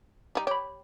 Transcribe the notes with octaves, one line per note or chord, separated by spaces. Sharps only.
G3 D#4
G4 C#5 B5